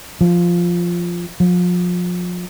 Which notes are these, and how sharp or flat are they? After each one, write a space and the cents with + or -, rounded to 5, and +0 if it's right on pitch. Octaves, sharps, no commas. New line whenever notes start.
F3 -5
F3 +30